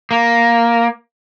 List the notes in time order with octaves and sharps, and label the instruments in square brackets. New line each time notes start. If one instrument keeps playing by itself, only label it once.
[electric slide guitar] A#3